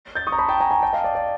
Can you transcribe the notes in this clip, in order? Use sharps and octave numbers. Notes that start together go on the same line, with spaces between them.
G6 A6
C#6 D#6
A#5
A5 B5
G5 A5
G#5 A#5
G#5 A#5
G5 A5
D#5 F5
D5
D5